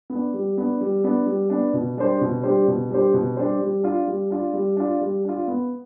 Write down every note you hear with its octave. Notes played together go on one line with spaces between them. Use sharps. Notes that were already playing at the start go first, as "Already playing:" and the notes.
B3
D4
G3
B3 D4
G3
B3 D4
G3
B3 D4
B2
G3 D4 G4 C5
B2
G3 D4 G4 C5
B2
G3 D4 G4 C5
B2
G3 D4 G4 C5
G3
D4 F4
G3
D4 F4
G3
D4 F4
G3
D4 F4
B3